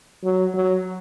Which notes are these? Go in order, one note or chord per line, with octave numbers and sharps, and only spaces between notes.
F#3
F#3